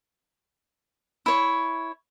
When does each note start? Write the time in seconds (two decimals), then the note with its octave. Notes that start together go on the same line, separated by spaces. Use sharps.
1.26 E4 C#5